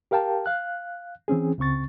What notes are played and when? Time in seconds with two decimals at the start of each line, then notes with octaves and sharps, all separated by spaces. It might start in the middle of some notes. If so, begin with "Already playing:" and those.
0.11 G4 A#4 F5 G5 A5
0.46 F5 F#6
1.28 E3 C4 C#4 G#4
1.58 C#2 C#3 C4 C#6 A6